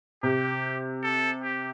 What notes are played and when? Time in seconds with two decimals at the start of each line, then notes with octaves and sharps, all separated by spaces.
0.23 C3 G4
1.03 A4
1.43 G4